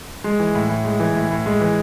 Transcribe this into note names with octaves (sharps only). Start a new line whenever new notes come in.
G#3
E3
A2
A2
G#3
E3
A2
A2
G#3
E3